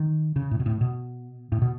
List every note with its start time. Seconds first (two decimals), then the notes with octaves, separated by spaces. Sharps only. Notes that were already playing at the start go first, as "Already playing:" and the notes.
Already playing: D#3
0.36 C#3
0.51 A2
0.60 B2
0.66 A2
0.81 B2
1.52 A2
1.62 B2